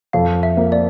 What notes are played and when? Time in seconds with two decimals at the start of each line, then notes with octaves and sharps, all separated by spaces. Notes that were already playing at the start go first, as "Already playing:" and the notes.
0.13 F2 F5
0.43 E5
0.57 A#3
0.72 D5